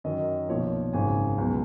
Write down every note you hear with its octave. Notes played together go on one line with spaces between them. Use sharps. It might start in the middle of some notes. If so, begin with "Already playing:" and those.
F#2 D#3 F#3 D#5
B1 A#2 F3 C#5
G#1 F#2 C#3 G#5
C#2 B2 F#3